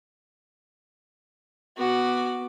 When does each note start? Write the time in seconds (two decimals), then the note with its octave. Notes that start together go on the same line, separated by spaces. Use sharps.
1.77 B3 F#4 D6